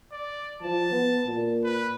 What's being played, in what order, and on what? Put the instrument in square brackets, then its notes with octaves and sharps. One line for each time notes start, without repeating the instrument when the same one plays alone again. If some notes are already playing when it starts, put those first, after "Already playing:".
[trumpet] D5
[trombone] F3 [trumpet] A5
[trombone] B3
A#2
[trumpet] B4